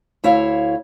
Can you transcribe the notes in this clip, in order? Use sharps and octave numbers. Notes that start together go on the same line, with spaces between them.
D2 E4 C#5 F5